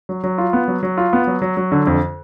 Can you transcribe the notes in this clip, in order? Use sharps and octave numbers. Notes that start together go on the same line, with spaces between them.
F#3
F#3
F4
B3
F#3
F#3
F4
B3
F#3
F#3
F#3
D3
F2